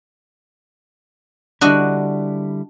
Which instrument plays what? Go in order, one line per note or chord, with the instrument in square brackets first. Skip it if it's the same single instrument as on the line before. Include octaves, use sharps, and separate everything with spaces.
[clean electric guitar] D3 G3 E4 [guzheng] D4 F#4 D#5